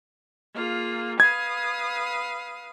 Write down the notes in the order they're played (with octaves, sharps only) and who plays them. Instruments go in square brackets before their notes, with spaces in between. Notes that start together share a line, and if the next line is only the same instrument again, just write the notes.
[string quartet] A#3 F4 G#4
[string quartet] B4 F5 D#6 [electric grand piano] G#6